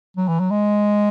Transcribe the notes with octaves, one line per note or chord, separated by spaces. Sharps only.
F#3
E3
F#3
G#3